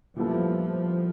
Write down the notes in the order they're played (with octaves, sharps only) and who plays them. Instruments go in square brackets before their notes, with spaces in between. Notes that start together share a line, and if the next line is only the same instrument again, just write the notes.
[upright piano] A#2 G3 B3 E4 A4 [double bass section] F3